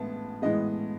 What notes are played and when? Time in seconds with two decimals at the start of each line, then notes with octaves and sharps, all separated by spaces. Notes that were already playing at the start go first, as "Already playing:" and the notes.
Already playing: A2 E3 G#3 B3 A5
0.42 A2 E3 G#3 B3 D#5